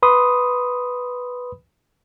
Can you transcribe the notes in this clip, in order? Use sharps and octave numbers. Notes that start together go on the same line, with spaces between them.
B4 B5 C6 D#6